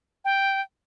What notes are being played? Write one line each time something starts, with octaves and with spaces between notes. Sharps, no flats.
G5